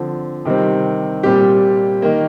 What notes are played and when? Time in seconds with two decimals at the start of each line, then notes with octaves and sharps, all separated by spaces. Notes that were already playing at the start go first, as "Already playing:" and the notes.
Already playing: D3 F3 C4
0.45 C3 D#3 G3 C4
1.23 A#2 G3 C4 G4
2.02 D#3 A#3